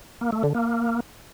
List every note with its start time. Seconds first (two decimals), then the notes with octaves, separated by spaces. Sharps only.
0.21 A#3
0.32 A3
0.43 D3
0.55 A#3